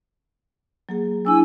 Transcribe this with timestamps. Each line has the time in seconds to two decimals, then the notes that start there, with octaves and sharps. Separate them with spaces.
0.89 F#3 A#3 G#4
1.25 F#3 D4 E4 G#5 E6